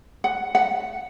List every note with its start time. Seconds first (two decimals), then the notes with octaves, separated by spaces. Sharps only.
0.24 F#5
0.55 F#5